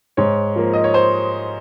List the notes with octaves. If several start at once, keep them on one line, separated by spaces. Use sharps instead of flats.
G#2 C#5
F3 A#3
D#5
C#5
C5